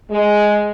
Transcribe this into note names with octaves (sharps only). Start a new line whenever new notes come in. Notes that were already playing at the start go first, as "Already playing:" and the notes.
G#3